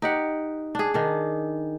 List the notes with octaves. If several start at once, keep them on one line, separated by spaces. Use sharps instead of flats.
D#4 G4 F#5
D4 G#4
D#3 D4